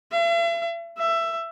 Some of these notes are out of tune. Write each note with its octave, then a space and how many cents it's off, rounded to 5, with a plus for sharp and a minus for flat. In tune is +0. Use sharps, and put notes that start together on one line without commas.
E5 +45
E5 +15